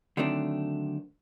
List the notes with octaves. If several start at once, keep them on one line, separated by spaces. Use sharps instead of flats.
D3 D#3 F#3 A3 C4 D4